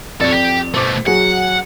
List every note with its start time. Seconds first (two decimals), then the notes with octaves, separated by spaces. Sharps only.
0.21 F2 A4 C#5 D5
0.32 G4
0.74 B2 A3 C5 D6
1.07 F#3 G#4 F#5